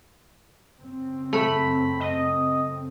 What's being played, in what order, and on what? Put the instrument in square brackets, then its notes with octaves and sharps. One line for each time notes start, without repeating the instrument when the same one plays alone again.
[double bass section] F#2 C#3 C4
[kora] A3 [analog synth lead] B5
[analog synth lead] D#5